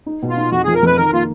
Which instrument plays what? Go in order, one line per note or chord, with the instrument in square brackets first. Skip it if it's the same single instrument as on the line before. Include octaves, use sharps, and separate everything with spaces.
[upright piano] D#4
B2
[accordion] F4
[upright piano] D#4
[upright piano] F2 [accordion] F#4
[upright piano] F3 [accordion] G#4
[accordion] A#4
[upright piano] F2 [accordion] B4
[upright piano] D#3 [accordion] A#4
[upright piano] A#3 [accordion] F4